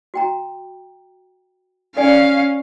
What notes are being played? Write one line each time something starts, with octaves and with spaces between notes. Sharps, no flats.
F#4 G5 A#5
C#4 A4 D5 F5 G#5